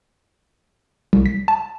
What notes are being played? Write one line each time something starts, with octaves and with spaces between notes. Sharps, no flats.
C2
B6
A5